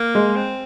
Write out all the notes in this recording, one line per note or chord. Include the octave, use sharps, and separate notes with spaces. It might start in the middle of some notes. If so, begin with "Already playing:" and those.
Already playing: A#3
G#3
C4